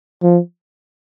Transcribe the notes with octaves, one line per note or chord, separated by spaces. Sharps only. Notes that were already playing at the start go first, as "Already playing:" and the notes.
F3